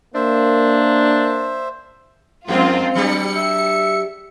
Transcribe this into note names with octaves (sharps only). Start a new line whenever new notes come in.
A#3 D4 C5 E5
F2 G#3 C4 F4 F#4 A#4
F#3 D4 G4 C#7
E5